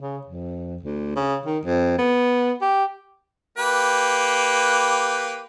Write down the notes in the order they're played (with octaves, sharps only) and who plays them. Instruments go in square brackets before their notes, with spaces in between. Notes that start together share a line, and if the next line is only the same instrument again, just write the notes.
[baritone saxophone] C#3
F2
D2
C#3
D#3
F2
B3
G4
[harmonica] A#3 G4 B4